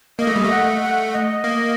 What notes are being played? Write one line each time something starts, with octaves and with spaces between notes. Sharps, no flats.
A#3 D#5
A3
G3
A3
F#5
F#5
D#5
A#3